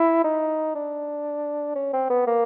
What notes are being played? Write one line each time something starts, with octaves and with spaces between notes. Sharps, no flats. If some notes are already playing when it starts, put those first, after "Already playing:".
Already playing: E4
D#4
D4
C#4
C4
B3
A#3